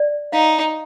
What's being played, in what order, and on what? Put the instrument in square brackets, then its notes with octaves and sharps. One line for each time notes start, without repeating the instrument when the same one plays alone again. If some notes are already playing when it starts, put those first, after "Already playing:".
Already playing: [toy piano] D5
[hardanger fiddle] D#4 [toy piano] F5